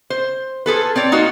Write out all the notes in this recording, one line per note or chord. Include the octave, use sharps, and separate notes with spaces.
C5
F4 G#4 A4 B4
C4 C#5 D5
A#3 D#4 F4 F#4